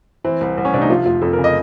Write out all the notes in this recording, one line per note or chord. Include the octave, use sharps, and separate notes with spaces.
E3 C4
C2
C2
C#4
C3 D4
D#4
F3 F4
F2 F4
F2 A4
A#4
C#3
D#5